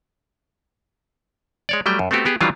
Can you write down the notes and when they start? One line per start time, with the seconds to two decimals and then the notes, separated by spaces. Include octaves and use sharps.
1.69 G#3 C#5 D5
1.86 F#3 G3 A3 G5
1.99 F#2
2.11 A3 B3 C4 F#4 G4
2.25 B3 G4 G#4
2.41 D#3 E3 F#3 G3 D4 F4